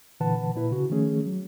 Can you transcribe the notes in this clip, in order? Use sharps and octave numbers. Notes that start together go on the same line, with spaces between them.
A#2 D3 E3 B4 F#5 A5
A#2 E4 B4
C#3 F#4
D#3 F3 A3 C#4 G#4
F#3